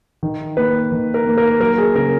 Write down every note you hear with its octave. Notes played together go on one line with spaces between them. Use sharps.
D#3
A#3 B4
D#3
A#4
A#3
A#4
F#3 A#4
G#4
C#3 A#4